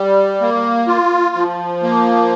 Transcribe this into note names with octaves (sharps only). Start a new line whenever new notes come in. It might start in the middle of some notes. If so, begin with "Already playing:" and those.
Already playing: G3
A#3
F4
F3
A#3